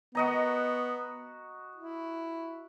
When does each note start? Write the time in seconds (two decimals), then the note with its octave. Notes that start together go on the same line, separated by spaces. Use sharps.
0.15 B3 F#4 D#5 A#5
1.76 E4